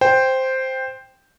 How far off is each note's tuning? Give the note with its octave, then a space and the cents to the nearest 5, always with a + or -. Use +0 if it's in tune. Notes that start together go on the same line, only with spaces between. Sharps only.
C5 +0 G5 +5